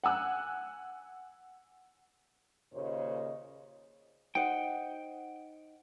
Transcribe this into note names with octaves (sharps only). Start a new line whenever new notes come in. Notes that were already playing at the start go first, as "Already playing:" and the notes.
F#5 G#5 E6 F#6
D#2 A#2 C#3 C5 C#5 D#5
D#4 C5 F#5 G5